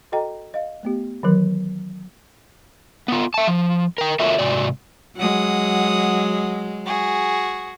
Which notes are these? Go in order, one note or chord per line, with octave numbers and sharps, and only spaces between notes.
F#4 A4 D#5 G5 A#5
D#5 F5
A3 B3 G4
D#3 E3 F#3 A#4
B3 F4
E5 A5
F3
A#4 G5
F4 F#4 A4 A#4 C#5 E5
G#2 C3 F#4 D5
F#3 G#3 F#5 D#6
F#4 G#4